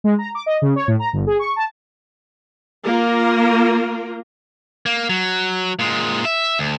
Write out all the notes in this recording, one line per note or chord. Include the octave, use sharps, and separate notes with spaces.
G#3
A#5
D6
D#5
C#3
C#5
A2
A#5
G1
G#4
C#6
A5
A#3 F4 A#4
A#3
F#3
A#2 G#3
E5
D2